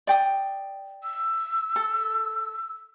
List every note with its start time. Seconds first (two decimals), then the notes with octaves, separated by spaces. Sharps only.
0.07 D5 G5 D#6
1.04 E6
1.76 A4